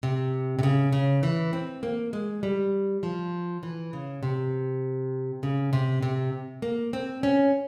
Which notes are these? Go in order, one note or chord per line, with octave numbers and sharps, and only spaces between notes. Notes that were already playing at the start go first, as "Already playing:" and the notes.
C3
C3
C#3
C#3
E3
C4
A#3
G#3
G3
F3
E3
C#3
C3
C#3
C3
C3
A#3
C4
C#4